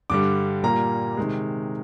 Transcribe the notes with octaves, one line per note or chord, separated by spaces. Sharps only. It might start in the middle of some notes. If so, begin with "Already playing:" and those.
G2 D3 G3 D6
A#2 G3 A#3 A#5
C3 D#3 G#3